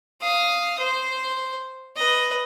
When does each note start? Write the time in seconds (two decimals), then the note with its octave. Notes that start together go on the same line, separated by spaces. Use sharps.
0.21 F5 D#6
0.79 C5
1.96 B4 D#5